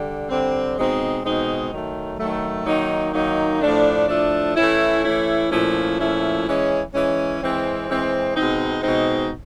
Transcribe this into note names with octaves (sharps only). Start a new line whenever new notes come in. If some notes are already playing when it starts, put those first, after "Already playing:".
Already playing: D3 G3
D3 G3 C4
B2 G#3 C4 D#4
B2 G#3 C4 D#4
D#3 F#3 A3
D#3 F#3 A3
D#3 F#3 A#3 D#4
D#3 F#3 A#3 D#4
A2 F3 A3 D4
A2 F3 A3 D4
E3 A3 C#4 E4
E3 A3 C#4 E4
A#2 F3 A3 C#4 E4
A#2 F3 A3 C#4 E4
E3 G#3 C#4
E3 G#3 C#4
E3 G#3 C4
E3 G#3 C4
B2 G#3 C4 D#4
B2 G#3 C4 D#4